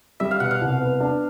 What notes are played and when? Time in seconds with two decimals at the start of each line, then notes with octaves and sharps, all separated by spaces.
0.20 G3 E5
0.31 F5
0.40 B2 F#5
0.51 F5
0.61 C2
0.80 B3
1.00 D4